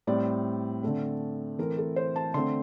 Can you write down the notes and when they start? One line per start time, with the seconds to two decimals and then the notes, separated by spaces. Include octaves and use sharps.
0.07 A2 G3 C4 D5
0.83 D3 A3 C4
1.59 E3 A3 C4 A#4
1.78 A4
1.96 C5
2.16 A5
2.34 D3 A3 C4 C6